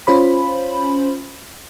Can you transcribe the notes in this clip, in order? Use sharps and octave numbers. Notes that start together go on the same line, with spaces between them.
C#4 F4 C5 B5